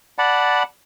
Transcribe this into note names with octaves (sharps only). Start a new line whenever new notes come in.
D5 F#5 A5 B5